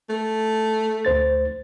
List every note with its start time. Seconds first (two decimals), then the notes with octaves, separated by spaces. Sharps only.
0.09 A3
1.05 D2 C5 A6